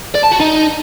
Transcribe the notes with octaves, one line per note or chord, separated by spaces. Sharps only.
D5
A5
F#4
D#4